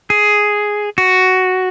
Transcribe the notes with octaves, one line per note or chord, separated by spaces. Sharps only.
G#4
F#4